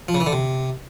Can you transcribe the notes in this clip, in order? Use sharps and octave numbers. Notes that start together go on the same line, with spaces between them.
F3
C#3
E3
D3
C3